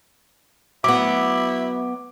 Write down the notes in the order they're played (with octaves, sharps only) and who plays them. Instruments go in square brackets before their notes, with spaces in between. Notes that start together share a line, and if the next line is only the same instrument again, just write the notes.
[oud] F#3 B3 [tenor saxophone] E4 [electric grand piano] D6